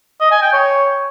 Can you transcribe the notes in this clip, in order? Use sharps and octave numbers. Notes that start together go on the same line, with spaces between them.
D#5
G#5
G5
C#5